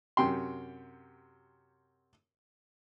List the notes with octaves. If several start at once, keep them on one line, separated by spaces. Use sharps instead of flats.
F#2 C3 G5 C6